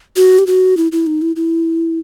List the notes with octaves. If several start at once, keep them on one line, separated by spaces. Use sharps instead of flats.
F#4
G4
F#4
E4
E4
D#4
E4
E4